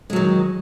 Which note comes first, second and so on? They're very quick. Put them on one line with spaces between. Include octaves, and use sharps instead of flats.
G#3 F#3 D#3